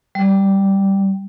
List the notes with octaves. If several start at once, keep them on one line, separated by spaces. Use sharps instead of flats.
G3